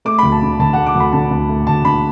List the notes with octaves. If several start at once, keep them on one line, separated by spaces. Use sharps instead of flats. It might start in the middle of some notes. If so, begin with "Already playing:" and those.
A3 D6
D2 B5
A5
D3
D2 A5
A3 F#5
D6
D2 B5
D3 A5
D2
A3
D2 A5
D3 B5